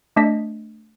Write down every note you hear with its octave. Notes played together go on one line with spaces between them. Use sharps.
A3 D4 D#5 B6